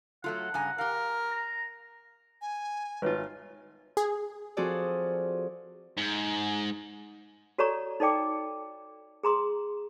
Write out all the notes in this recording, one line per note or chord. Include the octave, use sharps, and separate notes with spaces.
F#3 A3 F4 F#5
G2 C#3 G#5 A#5
G4 A#4 F5
A#5
G#5
G#1 F4 B4 C#5 E5
G#4
F3 C4 F#4 G#4 A4 D5
G#2
F#4 A4 C#5 D5 A#5 C#6
D#4 A4 D5 G5 D6
G#4 A#5 C6 D#6